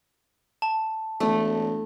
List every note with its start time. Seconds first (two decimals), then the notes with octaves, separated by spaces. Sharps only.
0.62 A5
1.20 E1 A3